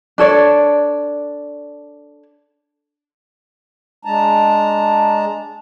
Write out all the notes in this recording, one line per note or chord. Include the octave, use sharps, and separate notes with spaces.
D4 A4 C#5 D5
G#3 D4 A5 A#5